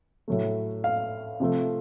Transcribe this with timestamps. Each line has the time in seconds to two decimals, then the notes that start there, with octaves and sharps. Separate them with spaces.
0.28 A2 F#3 A3
0.84 F5
1.40 C3 F3 A3